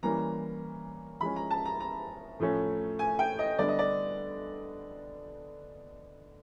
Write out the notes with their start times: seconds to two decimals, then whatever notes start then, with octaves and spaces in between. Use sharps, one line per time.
0.03 E3 G3 A#3 C#4 A#5
1.21 F3 G#3 C#4 B5
1.36 A#5
1.50 A5
1.65 A#5
1.80 A#5
2.40 A2 F3 A3 C#4
2.99 G#5
3.19 G5
3.39 D#5
3.58 D3 G3 B3 D4 D5
3.68 D#5
3.79 D5